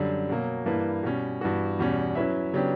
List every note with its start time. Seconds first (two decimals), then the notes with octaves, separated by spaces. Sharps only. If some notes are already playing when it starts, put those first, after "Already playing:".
Already playing: F#2 D3 G3
0.29 B2 F#3 A#3
0.66 G2 E3 A#3 E4 B4
1.03 B2 G3 C#4
1.41 G2 E3 B3 F#4
1.79 E2 B2 G3 C#4
2.15 F#3 C#4 E4 B4 E5
2.53 C#3 F#3 B3 D4 G4